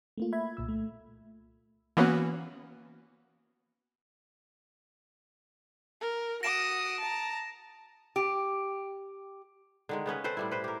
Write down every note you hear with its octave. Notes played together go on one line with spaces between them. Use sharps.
A3 A#3 F4
E5 B5 G#6
C2 A#2 E6
A3
E3 A#3 B3 C#4 F#4 B4
A#4
F#4 D#6 A#6 D7 E7
A5 A#5
G4
D3 D#3 G#3
C#3 B3 C#4 B4
C4 A4 B4 C5
A2 G3 E4
B4 C5
G4 A#4